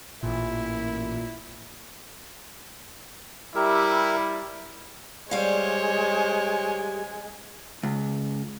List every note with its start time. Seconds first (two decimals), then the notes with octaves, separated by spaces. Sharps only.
0.23 A1 A#2 E4
3.55 G3 E4 G4 A#4 E5
5.31 G3 G#3 C5 C#5 F5 G#5
7.83 C#2